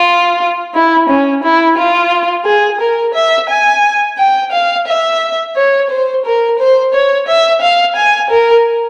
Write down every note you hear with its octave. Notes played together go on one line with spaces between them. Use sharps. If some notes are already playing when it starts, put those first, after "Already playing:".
Already playing: F4
E4
C#4
E4
F4
G#4
A#4
E5
G#5
G5
F5
E5
C#5
C5
A#4
C5
C#5
E5
F5
G#5
A#4